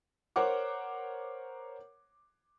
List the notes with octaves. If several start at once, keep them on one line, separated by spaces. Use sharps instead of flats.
A#4 C5 C#5 F#5 D6